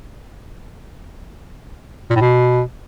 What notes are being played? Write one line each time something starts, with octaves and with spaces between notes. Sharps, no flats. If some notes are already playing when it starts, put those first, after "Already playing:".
A#2
A2
B2